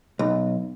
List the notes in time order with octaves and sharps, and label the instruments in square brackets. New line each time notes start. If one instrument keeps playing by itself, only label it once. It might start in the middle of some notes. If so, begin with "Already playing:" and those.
[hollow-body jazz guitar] B1